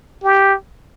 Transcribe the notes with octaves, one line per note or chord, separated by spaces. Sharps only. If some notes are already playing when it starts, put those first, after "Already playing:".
G4